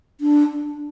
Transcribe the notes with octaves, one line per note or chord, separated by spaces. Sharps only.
D4